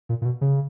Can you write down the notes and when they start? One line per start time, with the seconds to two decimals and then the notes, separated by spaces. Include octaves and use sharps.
0.09 A#2
0.22 A#2
0.25 B2
0.41 C#3